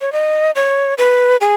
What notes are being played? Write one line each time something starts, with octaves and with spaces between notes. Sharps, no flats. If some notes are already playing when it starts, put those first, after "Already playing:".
C#5
D#5
C#5
B4
G#4